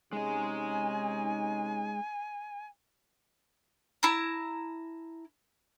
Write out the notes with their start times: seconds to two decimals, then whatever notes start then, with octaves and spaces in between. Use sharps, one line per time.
0.13 C3 G#3 C#4 D#4 G#4 G#5
4.03 E4 A5 A#5